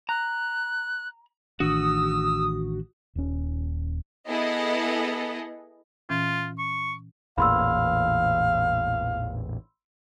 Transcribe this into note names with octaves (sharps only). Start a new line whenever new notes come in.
A#5 F#6
A1 D#3 D4 F#4 D#6 E6
D#1 C#4
B3 E4 G#4 A4 D#5
A#2 E3 C#4 F4
C#6
A1 E2 A#2 F5 B5 C6 E6